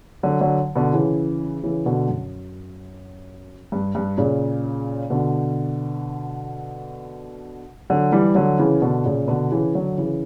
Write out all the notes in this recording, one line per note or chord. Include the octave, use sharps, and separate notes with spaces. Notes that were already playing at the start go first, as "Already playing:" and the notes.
D3 F#3
D3 F#3
B2 D3
C#3 E3
C#3 E3
B2 D3
F#2
G2
G2
A#2 C#3
B2 D3
D3 F#3
E3 G3
D3 F#3
C#3 E3
B2 D3
A#2 C#3
B2 D3
C#3 E3
D3 F#3
C#3 E3